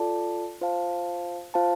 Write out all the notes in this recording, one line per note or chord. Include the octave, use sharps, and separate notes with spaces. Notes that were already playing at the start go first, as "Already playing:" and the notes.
Already playing: F4 A4 D5 A5
F4 C5 F5 A5
F4 C5 F5 A5